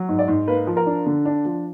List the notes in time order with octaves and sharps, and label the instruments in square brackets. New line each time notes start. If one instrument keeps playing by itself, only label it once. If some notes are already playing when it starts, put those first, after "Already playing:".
Already playing: [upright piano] F#3
G#2
D5
G#2
A#3 B4
F3
A#4
D4
D3
D4
F3